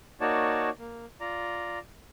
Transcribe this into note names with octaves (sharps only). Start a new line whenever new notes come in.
A#3 D#4 F#4 C#5 D5 A5
A#3
F4 D5 A#5